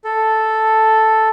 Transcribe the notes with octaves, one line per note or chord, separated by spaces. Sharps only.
A4